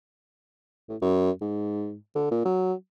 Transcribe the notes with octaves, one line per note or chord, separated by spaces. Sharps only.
A2
F#2
G#2
D3
A#2
F#3